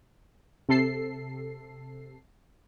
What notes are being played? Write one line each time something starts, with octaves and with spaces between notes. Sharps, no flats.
C3 A4 C7